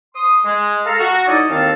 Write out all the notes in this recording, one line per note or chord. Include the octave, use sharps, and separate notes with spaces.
C6 D#6
G#3
A4 F5 A#5
F#4
F#3 D#4 E4 A4 D5 D#5
D#2 D#3 C4 A4 F5 A5